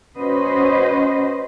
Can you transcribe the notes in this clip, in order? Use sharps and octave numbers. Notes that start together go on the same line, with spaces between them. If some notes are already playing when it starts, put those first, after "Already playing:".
C#4 F#4 B4 C5 D#5